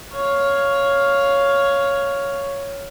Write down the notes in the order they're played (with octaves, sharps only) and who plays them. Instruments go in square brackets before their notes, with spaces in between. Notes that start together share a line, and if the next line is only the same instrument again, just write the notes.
[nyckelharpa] C#5 F5